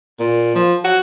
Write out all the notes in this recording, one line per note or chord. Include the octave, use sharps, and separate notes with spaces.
A#2
F3
F#4